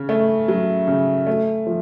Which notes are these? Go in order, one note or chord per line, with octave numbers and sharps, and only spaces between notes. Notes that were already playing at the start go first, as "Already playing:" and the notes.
Already playing: C#3
A3
F#3
C#3
A3
F3